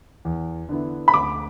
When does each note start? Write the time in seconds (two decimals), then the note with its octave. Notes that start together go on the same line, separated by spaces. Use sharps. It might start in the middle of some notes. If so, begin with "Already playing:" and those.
0.25 E2
0.69 D3 B3 E4
1.08 B5
1.14 D2 D6